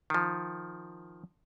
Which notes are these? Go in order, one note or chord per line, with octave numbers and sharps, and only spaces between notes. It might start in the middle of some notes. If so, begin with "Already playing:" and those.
D#3 F3